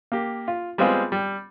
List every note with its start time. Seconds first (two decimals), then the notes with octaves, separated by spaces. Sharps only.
0.12 A#3 G4
0.48 F4
0.78 G3 G#3 B3 C4 F4 G#4
1.12 G3